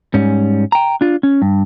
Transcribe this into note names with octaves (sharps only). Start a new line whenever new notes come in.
G#2 G3 C#4
G5 A#5
D4 F4
C#4
G2